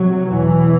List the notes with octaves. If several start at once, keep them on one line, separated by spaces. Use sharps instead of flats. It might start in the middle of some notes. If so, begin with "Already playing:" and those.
Already playing: C3 F#3
E2 B2 E3